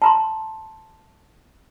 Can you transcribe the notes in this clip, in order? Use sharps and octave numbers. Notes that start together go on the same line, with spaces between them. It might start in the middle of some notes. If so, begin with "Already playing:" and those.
A5 A#5 C6